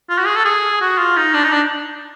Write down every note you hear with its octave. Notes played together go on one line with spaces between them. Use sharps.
F4
F#4
G#4
A4
G#4
F#4
F4
D#4
D4
D#4
D4